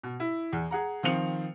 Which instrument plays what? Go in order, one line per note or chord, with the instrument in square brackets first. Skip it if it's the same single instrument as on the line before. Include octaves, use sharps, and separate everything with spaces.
[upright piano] B2
E4
E2
G#4 F#5 A#5
D#3 F3 C4 C#7 F7